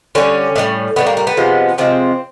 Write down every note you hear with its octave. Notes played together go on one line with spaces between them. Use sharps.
D3 G3 C#4
A2 E3 G3
A2 E3 G3 B3
A#3
A#3
B3
C3 F3 G#3
C3 F3 G#3 C4